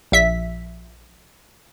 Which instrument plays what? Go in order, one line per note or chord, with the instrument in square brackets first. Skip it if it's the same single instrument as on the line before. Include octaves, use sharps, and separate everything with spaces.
[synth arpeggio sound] A#1 E5 B6